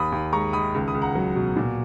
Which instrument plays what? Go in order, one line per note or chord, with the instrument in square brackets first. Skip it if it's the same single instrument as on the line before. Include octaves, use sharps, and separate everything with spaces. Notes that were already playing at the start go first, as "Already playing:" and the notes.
Already playing: [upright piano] D#2 B5 D#6
D#2
G#3 A#5 C#6
D#3 B5 D#6
C#2
B5 D#6
C#2
F#5 A#5
F#3
B2
A#2